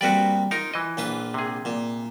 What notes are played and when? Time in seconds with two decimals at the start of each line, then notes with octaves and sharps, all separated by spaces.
0.01 G3 A#3 C4 F#4 B4 D5
0.51 D#4 F4 A#4
0.74 E3 D#5
0.97 A#1 F4 B4
1.34 C3 G#4
1.65 A#2